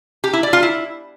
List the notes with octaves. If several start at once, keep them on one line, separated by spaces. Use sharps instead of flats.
G4
E4
D5
F4
E4